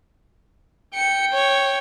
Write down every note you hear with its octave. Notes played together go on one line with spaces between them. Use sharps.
G5 C#7
C#5